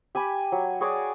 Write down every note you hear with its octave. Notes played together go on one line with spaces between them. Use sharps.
G4 G#5 B5
F#3
F#4 G#4 C#5 D5